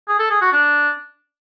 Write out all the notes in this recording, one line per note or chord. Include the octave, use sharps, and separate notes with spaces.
G#4
A4
G#4
F#4
D4